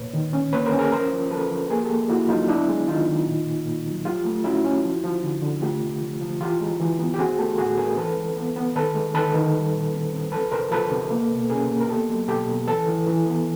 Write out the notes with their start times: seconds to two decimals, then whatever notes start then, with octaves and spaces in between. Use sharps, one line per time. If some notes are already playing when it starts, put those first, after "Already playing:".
Already playing: A#2 B4 C#5
0.13 D#3
0.33 C#4
0.53 A#3 B4 C#5
0.66 A#4 C5
0.72 C#4
0.79 G#4 A#4
0.92 F3 A#4 C5
1.12 F3
1.31 F3 A4 B4
1.51 F3
1.70 A#3 G#4 A#4
1.83 G4 A4
1.90 A#3
2.09 A#3 E4 F#4
2.28 F#3 D#4 F4
2.48 B3 D4 E4
2.68 G#3
2.88 D#3 D#4 F4
3.07 D#3
3.27 A#2
3.47 A#2
3.66 A#2
3.86 F#3
4.05 F3 F4 G4
4.25 A3
4.44 C#4 E4 F#4
4.64 C#4
4.83 F3
5.04 F3
5.23 D3
5.42 D3
5.62 A3 F4 G4
5.82 C3
6.01 F3
6.21 F3
6.40 E3 F4 G4
6.60 G#3
6.80 E3
6.99 B3
7.14 G4
7.19 C4 F#4 G#4
7.38 A3 G4 A4
7.58 A2 F#4 G#4
7.78 C4 G#4 A#4
7.97 E3 A4 B4
8.17 G#3
8.37 B3
8.56 B3
8.76 D#3 A4 B4
8.95 G#3
9.15 D#3 A4 B4
9.34 D#3
9.54 G3
9.74 A#2
9.93 C4
10.13 C4
10.32 F3 A4 B4
10.52 C3 A#4 C5
10.71 F3 A4 B4
10.91 C3
11.11 A#3
11.30 B2
11.50 C#4 G#4 A#4
11.70 A#3
11.81 A#4
11.89 B3 G4 A4
12.09 F#3
12.28 B2 G4 A4
12.47 B2
12.67 E3 A4 B4
12.87 E3
13.07 E3
13.26 B3